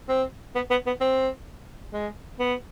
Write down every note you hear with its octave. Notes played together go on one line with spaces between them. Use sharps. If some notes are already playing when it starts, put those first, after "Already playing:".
C4
B3
B3
B3
C4
G#3
B3